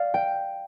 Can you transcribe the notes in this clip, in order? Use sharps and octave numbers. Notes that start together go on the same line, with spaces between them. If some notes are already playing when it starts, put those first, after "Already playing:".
Already playing: D5 F5
G5